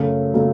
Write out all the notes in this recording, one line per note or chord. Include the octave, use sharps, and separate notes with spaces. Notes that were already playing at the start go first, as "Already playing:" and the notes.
Already playing: F#2 C#3 F#3 A3
C#3 F#3 A3